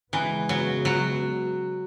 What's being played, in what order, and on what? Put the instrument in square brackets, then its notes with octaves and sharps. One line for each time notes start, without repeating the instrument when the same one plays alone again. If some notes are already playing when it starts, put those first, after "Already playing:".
[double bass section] C#3 G#3 B3 [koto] E3
[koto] F#3
F#3